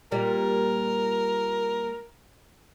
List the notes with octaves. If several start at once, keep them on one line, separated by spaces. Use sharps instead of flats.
A#2 G3 A#4